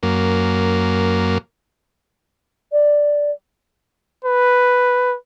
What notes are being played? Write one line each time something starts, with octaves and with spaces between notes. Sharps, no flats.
F#2 A#3
D5
B4